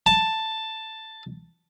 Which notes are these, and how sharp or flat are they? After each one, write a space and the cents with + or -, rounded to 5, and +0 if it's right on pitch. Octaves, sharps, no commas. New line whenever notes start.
A5 +5